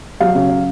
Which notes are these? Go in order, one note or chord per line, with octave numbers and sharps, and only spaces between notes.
F#3 F5
C#3
C#3